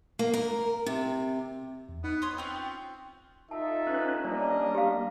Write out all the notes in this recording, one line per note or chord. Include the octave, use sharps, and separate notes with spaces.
A#3
A#4
C3
E2
B3 D#4
C#5 C6 D#6
C4 C#4 F4
G5
D#4 F4 A4 E5 A5
C#4 B4
G3 A#3 C#4 D4 D5 D#5 A#5
G4 F5